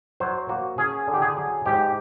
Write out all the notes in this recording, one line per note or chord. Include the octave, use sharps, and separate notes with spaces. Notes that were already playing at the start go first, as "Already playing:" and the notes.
F#3 C5
A#3 F#4
C#4 G#4
D3
G4
G#4
F#3
G#2 G4